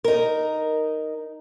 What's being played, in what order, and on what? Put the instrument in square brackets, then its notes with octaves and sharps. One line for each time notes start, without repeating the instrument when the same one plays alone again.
[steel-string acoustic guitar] D#4 A#4